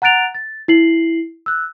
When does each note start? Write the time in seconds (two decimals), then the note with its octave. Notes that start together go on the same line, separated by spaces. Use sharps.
0.02 F#5 A#5 F#6 A6 D7 F7
0.35 A6
0.68 E4 C7 F#7
1.46 E6 F#6